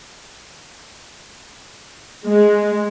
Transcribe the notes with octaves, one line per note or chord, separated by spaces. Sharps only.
G#3